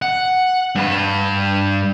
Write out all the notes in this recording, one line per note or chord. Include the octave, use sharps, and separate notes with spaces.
F#5
G2 B4